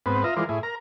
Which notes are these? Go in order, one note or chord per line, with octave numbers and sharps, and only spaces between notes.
G#2 B3 C4 B4
F4 D#5 E5 A#5
E3 G#3 F4 A#4 C5 D5
A2 E4 G#4
A#4 A#5